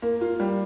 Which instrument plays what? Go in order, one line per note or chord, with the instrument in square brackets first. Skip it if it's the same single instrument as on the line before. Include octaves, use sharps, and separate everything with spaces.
[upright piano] A#3
F4
G3